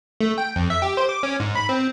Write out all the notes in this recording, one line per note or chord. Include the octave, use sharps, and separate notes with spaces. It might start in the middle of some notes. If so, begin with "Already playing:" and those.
A3
G5
F2
E5
G4
C5
D6
C#4
G#2
B5
C4